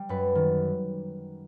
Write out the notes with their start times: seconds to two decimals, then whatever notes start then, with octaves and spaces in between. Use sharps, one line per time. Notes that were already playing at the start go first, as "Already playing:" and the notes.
Already playing: G3
0.09 F#2 B4
0.35 D#3